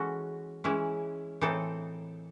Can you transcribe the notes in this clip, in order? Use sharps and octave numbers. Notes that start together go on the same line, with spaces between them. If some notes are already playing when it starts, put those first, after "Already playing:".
Already playing: E3 G#3 C#4 F#4 A4
E3 G#3 C#4 E4
A2 E3 C4 D#4 A4